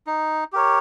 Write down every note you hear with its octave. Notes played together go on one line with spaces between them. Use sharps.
D#4
G4 A#4 C#5